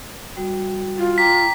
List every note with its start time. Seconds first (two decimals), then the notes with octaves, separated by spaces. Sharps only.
0.37 G3 F#4
0.98 F4
1.18 G5 A#5 D6 B6